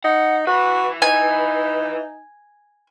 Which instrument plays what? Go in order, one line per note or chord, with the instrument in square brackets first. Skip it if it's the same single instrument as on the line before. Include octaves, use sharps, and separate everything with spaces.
[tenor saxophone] D#4 [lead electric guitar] F#5
[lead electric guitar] E4 B4 [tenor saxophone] F#4
[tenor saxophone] D#4 [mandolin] G#5